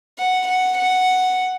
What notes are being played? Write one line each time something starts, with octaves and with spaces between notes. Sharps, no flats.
F#5
F#5
F#5